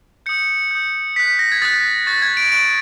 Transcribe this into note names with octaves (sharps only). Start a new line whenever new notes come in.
D#6 G6 C#7
D#6 G6
D#6 F#6 B6
A#6
G#6
D#6 F#6 A6
C#6 F#6 A6
G#6
D7
C#6 F#6 D7